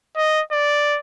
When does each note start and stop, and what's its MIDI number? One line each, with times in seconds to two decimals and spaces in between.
0.17 0.41 75
0.52 0.99 74